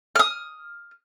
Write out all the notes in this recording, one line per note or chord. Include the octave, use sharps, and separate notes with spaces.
D#6 F6